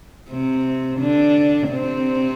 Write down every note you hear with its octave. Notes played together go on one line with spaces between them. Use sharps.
C3 C4
D3 D4
C3 C4